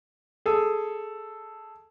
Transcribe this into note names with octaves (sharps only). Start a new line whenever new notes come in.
G#4 A4